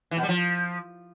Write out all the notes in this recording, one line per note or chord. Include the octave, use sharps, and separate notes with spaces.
E3
B2
G3
F3